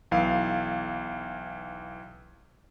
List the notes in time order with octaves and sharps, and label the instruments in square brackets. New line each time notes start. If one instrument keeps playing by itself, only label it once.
[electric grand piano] B1 E3 F5